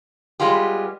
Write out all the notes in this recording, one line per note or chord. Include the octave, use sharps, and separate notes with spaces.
G3 G#3 B3 F4 G4